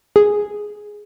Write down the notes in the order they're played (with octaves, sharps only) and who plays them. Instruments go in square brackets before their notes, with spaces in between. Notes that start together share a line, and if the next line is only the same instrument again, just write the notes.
[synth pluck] G#4